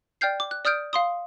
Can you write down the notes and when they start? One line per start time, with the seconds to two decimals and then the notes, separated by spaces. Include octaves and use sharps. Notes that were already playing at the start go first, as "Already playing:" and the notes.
0.21 D5 G5 F6 G6 C7
0.40 D6
0.51 F#6
0.65 D5 D#6 F6 G6 D7
0.93 F5 C6 D#6